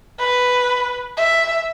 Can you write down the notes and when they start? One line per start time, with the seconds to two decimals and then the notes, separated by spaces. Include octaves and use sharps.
0.19 B4
1.17 E5